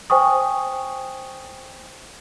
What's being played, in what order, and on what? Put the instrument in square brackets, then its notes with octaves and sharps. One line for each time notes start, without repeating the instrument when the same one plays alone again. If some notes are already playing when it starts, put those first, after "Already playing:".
[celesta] C5 G5 G#5 C#6 D#6